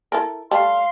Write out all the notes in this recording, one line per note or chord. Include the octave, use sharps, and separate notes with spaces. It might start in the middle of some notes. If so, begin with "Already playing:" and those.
E4 A4 A#4
G3 A3 F5 C6 F6